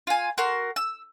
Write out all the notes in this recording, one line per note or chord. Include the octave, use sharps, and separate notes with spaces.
F4 G#5
F#4 A#4 C6
E6